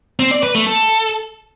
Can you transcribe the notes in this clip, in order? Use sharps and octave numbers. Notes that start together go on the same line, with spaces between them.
C4
D5
B4
A3
A4